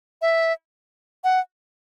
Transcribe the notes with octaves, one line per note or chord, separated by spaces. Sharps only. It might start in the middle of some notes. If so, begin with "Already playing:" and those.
E5
F#5